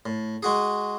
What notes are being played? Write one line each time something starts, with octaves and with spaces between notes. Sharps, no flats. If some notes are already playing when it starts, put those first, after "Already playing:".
A2
G#3 F#4 G#4